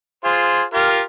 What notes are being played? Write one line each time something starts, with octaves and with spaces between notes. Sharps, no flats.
F4 G#4 C5
F4 G4 A#4